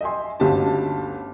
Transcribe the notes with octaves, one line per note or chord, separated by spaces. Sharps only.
D#5 E5 G5 G#5 C6
G1 D2 C#4 D#4 G4 A5